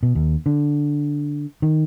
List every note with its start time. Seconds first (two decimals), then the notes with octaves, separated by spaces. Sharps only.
0.03 B2
0.15 D#2
0.46 D3
1.62 D#3